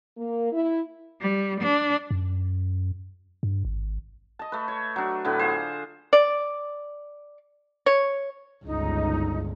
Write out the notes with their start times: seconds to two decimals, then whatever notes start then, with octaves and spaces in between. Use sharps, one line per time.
0.18 A#3
0.52 E4
1.21 G3
1.61 D4
2.11 F#2
3.43 G2
3.65 G#1
4.39 D#5 A5
4.52 A3 B4
4.68 C#5
4.96 F#3 D4
5.25 A2 D3 B3
5.39 F4 G#4 C5
6.13 D5
7.86 C#5
8.65 G1 C#2 D#4